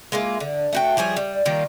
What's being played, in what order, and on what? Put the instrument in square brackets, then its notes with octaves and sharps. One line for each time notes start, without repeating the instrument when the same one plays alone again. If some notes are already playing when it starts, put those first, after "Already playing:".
[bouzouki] G#3 A#3 E4 F4
D3
A3 F#4 G5
F3 G3 G#4 C#5
G3
D#3 G3 A#3 F4